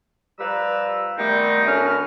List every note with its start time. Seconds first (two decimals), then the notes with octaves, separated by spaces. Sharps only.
0.39 F3 G3 B4 A#5 E6
1.17 D#3 G3 A3 B3 C4 D#4
1.66 D2 C#4 D4 A#4 B4 F6